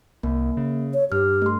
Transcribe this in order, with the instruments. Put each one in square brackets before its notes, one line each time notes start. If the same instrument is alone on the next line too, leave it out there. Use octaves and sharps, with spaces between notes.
[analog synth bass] C2 [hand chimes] A#3
[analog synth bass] C#3
[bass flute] C#5
[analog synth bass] G2 [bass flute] G4 [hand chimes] F6
[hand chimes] A3 C6